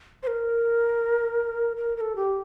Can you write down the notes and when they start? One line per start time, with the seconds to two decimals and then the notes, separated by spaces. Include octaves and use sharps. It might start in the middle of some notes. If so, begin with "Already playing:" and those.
0.23 C5
0.27 A#4
1.77 A#4
1.97 A#4
2.01 A4
2.16 G4